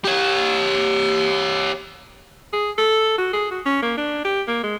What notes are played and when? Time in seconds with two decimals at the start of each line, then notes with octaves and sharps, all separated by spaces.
0.05 G4 C#5
2.53 G#4
2.78 A4
3.18 F#4
3.33 G#4
3.51 F#4
3.66 C#4
3.82 A#3
3.97 D4
4.25 G4
4.48 A#3
4.64 G#3